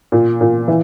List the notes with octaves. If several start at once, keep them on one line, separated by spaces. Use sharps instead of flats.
A#2
A#2
E3